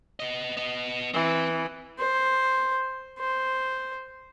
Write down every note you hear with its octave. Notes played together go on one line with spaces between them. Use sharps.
B3 D#5
B3 D#5
E3 C4
C5
C5